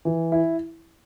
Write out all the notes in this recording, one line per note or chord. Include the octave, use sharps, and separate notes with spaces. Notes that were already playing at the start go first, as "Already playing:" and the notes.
E3
E4